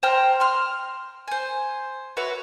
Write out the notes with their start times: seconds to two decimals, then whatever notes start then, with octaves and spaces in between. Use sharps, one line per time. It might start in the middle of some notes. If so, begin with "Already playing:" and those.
0.03 C5 G5 A#5 F6
0.40 C6 F6
1.28 C5 G#5
2.17 F#4 B4 C#5 E5